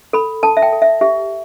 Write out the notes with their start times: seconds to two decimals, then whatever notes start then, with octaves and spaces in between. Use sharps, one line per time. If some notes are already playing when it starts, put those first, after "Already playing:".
0.13 A4 B5
0.43 A4 A5
0.57 E5
0.62 G5
0.73 A4
0.82 E5
1.01 G4 E5